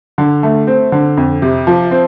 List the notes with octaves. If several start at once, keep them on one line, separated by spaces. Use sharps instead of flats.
D3
A3
C4
D3
F2
C3
F3
C4